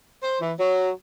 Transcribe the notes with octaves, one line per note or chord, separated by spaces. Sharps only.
C5
E3
F#3